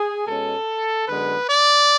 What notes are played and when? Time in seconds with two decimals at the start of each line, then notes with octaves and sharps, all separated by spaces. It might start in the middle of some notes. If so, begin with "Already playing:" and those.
Already playing: G#4
0.27 B2 G#3 C#4 A4
1.08 F#2 D3 G#3 B3 B4
1.49 D5